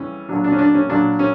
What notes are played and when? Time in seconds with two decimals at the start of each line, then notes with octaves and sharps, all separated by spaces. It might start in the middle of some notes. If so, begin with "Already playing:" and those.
Already playing: F2 C#3 E3 G3 C#4
0.29 A#2 F#3 D4
0.44 D4
0.52 C#4
0.59 D4
0.74 C#4
0.89 A#2 F#3 D4
1.19 C#4